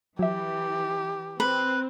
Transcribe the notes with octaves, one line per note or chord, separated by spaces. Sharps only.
E3 F#3 G4 E5
C4 B4